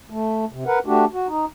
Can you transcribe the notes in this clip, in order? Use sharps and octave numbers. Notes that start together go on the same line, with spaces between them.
A3
C3
A#4 B4 F#5
A3 D4 F#4 G4
F#4
D#4